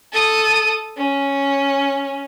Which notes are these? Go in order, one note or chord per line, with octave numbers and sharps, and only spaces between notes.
A4 D#6
C#4